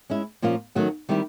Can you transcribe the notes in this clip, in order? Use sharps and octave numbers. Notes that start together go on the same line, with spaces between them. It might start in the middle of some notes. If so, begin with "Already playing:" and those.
G#3 C#4 E4
A#2 F3 A#3 C#4 F4
D#3 F#3 A3 C#4 F#4
D#3 G3 C4 E4 G4